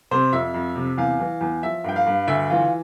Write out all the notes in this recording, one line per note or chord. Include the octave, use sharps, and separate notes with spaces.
C3 C5
F2 E5
F2
C3
E2 F5
E3
E2
F3 E5
G2 G5
F5
G2
D2 E5
E3 F4